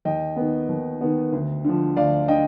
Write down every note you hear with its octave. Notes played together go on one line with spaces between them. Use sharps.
D#2 D#5 G5
D#3 B3
D#2
D#3 B3
D2
D3 F3
D2 D5 F5
D3 D#5 G5